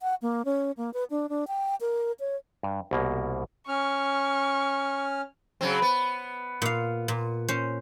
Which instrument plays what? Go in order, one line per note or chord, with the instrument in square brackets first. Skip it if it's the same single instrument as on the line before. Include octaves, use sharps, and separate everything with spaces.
[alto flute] F#5
A#3
C#4
A#3
B4
D4
D4
G5
A#4
C#5
[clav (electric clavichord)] G2
C2 B2 A#3
[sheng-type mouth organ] C#4 F6 [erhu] C#6
[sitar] C#3 F#3 C4
B3
[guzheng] A#2 F5
A#2
C#4 C5